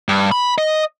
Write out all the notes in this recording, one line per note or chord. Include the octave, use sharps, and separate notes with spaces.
G2
B5
D#5